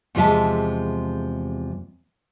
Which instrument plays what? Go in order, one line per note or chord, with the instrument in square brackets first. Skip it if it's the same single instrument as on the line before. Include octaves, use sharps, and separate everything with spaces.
[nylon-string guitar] E2 C3 F3 G#3 E5 A5